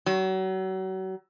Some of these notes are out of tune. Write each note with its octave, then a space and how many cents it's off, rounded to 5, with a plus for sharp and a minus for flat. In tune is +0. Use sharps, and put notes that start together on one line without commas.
F#3 +35